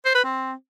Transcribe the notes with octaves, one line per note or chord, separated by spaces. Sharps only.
C5
B4
C4